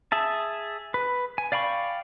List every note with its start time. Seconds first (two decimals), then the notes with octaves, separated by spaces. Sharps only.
0.12 G#4 E5 A5
0.94 B4
1.38 G#5
1.52 D5 F5 G5 B5 C#6